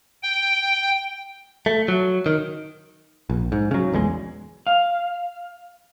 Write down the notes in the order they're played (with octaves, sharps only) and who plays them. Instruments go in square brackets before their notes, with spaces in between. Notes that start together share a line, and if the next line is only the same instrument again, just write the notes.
[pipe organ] G5
[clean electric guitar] A3
F#3
D#3
[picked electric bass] A#1
G#2
C#3 F#3
A#1 E2 D3 G#3
[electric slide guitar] F5